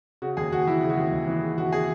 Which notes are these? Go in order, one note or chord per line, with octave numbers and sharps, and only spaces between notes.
C#3 F#4
D#2 G#4
D#2 F#4
E3 E4
C#3
F#4
D#2
D#2
E3
C#3
D#2 F#4
G#4